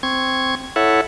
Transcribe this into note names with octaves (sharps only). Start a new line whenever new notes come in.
C4 C#6 G#6
E4 A4 C#5 E5 F#5